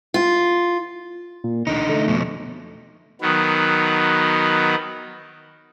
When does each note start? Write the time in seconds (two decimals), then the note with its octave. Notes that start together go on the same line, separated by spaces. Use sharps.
0.14 F4
1.44 A#2
1.67 D2 D3 D#4
1.89 A3
2.08 F2 B2
3.21 D#3 F#3 B3